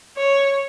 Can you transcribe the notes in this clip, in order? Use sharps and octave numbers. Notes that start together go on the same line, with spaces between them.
C#5